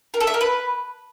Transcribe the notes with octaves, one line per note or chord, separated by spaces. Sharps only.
A#4
A4
E5
A#4
B4